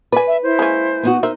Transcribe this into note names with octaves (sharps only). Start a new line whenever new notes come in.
B4 D5 G#5
E5
E4 C5
G#3 A#3 C#4
B3 D#4 F#4
D#4 A#4 C5 E5